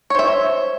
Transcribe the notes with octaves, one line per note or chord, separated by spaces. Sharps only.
C5 C#5 E5